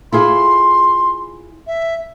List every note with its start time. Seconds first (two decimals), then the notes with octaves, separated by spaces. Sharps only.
0.13 E4 F4 G#4 C6
1.67 E5